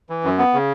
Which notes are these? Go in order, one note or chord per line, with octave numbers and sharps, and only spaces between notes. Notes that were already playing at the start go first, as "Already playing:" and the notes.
E3
F#2
B3
C#3